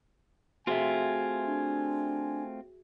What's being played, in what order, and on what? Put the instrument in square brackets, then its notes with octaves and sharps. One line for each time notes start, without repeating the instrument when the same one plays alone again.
[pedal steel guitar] A3 C4 F4 [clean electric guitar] F#4 G#4 E5 [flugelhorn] G#5
[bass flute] D4